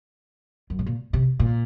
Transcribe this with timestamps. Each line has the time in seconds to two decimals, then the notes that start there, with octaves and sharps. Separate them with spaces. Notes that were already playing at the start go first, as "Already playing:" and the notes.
0.70 F#2
0.79 A2
0.86 A#2
1.13 C3
1.39 A#2